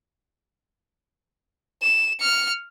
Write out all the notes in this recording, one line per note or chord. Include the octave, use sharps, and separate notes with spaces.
E7
F6 C#7